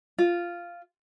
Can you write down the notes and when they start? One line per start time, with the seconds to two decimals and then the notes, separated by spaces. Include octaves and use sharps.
0.18 F4